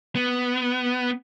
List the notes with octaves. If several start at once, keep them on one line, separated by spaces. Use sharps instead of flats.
B3